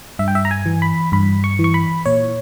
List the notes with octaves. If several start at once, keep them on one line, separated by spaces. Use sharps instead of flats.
G2 E5
G5
E5
A#5
G#5
E3
B5
G2 B5
C#6
E3
C#6
B5
A#2 C#5